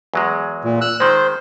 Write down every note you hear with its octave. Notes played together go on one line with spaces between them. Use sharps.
E2 F#3 G#3
A#2
E6 F#6
D#3 G#3 C5